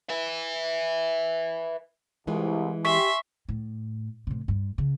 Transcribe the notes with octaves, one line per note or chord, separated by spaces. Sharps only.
B4 E5
C2 E3 G#3 F4
G4 E5 G#5 C6 C#6 B6
A2
A2 C3
G2
C#3